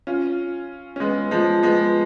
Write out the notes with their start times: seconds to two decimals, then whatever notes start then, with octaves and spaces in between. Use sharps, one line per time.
0.07 C#4 F4
0.96 C#4
1.00 G#3 B3
1.31 F3 G#3
1.63 G#3 B3